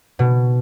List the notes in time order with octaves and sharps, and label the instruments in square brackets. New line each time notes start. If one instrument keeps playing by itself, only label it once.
[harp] B2